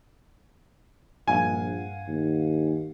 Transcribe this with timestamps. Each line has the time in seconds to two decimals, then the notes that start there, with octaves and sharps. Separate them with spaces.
1.28 A#1 G2 F5 F#5 G#5
2.07 D#2